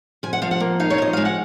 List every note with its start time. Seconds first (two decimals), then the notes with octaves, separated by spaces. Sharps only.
0.23 F3 G#5
0.33 F#5
0.42 F3 F5
0.51 F#5
0.60 A#3
0.80 D#4 F5
0.90 C#5
0.98 F3 D#5
1.13 G#3 F5
1.25 F#5